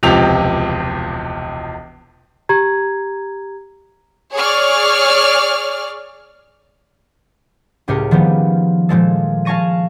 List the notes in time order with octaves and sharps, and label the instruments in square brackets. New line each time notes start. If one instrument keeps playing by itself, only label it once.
[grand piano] E1 C#2 C3 F3 G4 F7
[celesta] G4 A#5 G#6
[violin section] G#4 C#5 D5 F6
[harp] C#2 A2 G4 G#4 A#4 C#7
D#3 F3 G3 B3
A#2 F3 G#3 A4
F5 G#5 A5 C#6 A#6 D#7